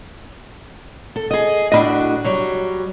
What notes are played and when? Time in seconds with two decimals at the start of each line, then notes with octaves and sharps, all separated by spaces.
1.16 A4
1.31 G#4 D#5
1.72 A2 D4 F#4 D#5 B5
2.24 F#3 G3